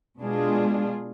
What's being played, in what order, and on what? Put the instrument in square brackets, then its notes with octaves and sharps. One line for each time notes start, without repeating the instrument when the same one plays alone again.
[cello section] B2 G#3 D4 F4 G#4